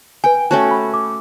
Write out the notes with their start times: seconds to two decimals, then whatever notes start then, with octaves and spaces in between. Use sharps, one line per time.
0.24 B4 G5 G#5
0.51 A3 C#4 F#4 G5 A5
0.71 B5
0.94 D6